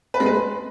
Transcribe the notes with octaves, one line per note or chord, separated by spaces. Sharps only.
B4
G#3
B4